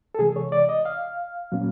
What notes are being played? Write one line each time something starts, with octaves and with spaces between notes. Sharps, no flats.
A4
C3 E3 G#3 G#4
C#5
D5
D#5
F5
A#2 F#3 A#3 C#4